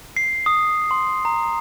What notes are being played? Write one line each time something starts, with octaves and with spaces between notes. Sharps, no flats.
C7
D#6
C6
A#5